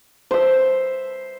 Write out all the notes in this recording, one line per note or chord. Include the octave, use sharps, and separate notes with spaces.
C5 E5